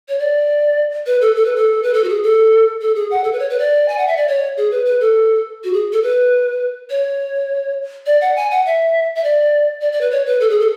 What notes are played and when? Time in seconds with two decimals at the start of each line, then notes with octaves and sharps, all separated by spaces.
0.09 C#5
0.19 D5
1.06 B4
1.21 A4
1.36 A4
1.45 B4
1.56 A4
1.83 B4
1.94 A4
2.04 F#4
2.08 G#4
2.23 A4
2.82 A4
2.95 G#4
3.11 F#5
3.24 A4
3.33 B4
3.39 C#5
3.50 B4
3.59 D5
3.88 G#5
3.98 F#5
4.08 E5
4.17 D5
4.28 C#5
4.57 G#4
4.71 B4
4.85 B4
5.01 A4
5.64 F#4
5.73 G#4
5.93 A4
6.03 B4
6.90 C#5
8.06 D5
8.21 F#5
8.36 G#5
8.51 F#5
8.66 E5
9.16 E5
9.24 D5
9.81 D5
9.92 D5
10.01 B4
10.11 C#5
10.26 B4
10.40 A4
10.50 G#4
10.60 A4